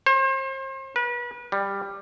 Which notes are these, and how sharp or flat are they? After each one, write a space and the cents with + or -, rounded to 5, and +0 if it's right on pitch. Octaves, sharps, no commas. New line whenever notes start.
C5 +35
B4 -35
G3 +10